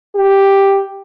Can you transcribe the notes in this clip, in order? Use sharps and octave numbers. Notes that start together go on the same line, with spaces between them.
G4